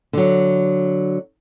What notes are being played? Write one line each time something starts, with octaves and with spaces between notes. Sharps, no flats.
D3 F#3